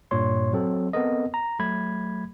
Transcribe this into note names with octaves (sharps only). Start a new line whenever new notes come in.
G2 A#2 C#5 C6
F#3 C4 A4
B3 C4 A4 A#4 D#5
A#5
F#3 A3 B5 G#6